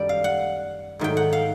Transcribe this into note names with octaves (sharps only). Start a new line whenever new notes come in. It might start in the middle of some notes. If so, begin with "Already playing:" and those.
Already playing: F#2 D#3 G3 D5
F5
F#5
G#2 D#3 F#3 A3 G5
F#5
F5